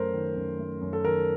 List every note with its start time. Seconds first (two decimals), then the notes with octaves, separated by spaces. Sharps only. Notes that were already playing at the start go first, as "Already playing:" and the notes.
Already playing: F#2 A3 A#4 C5
0.13 D#3
0.36 F#2
0.59 A3
0.81 F#2
0.93 A4
1.04 D#3 A#4